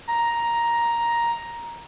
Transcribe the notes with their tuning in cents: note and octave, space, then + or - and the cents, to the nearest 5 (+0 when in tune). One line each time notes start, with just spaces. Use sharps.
A#5 +5